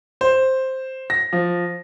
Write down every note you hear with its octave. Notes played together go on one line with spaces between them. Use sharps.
C5
A#6
F3